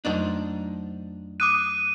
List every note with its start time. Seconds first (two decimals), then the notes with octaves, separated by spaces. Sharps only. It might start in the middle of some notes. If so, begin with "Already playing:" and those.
0.05 F2 F#3 A3 D4 D#4 C5
1.40 D6 D#6 F#6 D#7